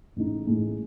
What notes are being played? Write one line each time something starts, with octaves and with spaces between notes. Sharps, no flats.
A1 A2 G#3 D#4
A1 A2 G#3 D#4